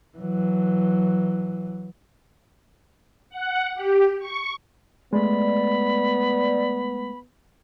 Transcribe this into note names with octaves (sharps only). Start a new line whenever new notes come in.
E3 F#3
F#5
G4
C#6
G#3 A3 B3 D5 B5